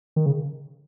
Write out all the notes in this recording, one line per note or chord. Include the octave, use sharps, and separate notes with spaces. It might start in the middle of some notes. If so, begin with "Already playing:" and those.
D#3
C#3